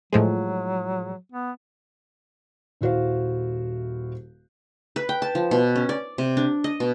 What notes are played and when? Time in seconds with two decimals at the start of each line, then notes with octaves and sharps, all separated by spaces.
0.13 A2 F3 F#3 G#3
1.32 B3
2.81 D#1 E4 F#4 C5 F5
4.96 B4
5.09 G5
5.22 A5
5.35 F3
5.51 B2
5.76 C#4
5.89 D5
6.18 C3
6.37 D4
6.64 D#5
6.80 B2